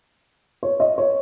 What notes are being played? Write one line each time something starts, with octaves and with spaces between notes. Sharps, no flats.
C#5
D#5
C#5